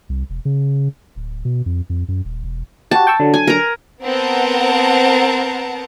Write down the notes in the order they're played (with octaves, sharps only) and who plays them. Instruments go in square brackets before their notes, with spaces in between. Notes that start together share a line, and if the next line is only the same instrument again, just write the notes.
[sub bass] C2
E1
C#3
D1
B2
F2
F2
F#2
D#1
E1
[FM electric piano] F#4 G4 [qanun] A5
[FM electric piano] G5 C#6 E6
D3 F#3
[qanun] G#5
A#4 A#5
[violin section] B3 C4 A#4 F#5 A5 A#5